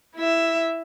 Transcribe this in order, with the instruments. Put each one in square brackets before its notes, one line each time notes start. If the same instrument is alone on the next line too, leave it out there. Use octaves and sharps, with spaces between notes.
[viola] E4 E5